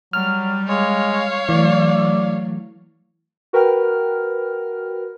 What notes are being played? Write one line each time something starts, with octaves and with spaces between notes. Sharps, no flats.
F#3 G3 F6
G#3 C#5 F5
E3 F#3 A3 D5
F#4 A#4 B4 G5 F6